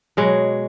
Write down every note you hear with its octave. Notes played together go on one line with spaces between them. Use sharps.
B2 F#3 G#3